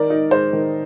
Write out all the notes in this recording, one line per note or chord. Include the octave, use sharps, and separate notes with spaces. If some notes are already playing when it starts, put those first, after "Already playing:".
Already playing: D#3 A#4 D5
D#4
G#3 C5
D#3